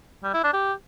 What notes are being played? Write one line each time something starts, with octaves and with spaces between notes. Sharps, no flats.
G3
E4
D4
G4